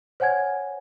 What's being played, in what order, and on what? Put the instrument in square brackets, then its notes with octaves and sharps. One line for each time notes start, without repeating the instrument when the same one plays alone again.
[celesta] C5 C#5 F#5 G#5 G#6